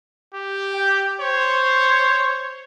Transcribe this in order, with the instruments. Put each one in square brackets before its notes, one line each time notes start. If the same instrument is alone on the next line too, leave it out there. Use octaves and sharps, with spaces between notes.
[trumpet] G4
[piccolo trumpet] G5
[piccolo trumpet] C5 [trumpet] C#5